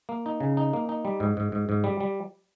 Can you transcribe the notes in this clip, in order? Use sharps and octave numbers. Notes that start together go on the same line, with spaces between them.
A#3
D#4
C#3
D#4
A#3
D#4
G3
G#2
G#2
G#2
G#2
G3
G3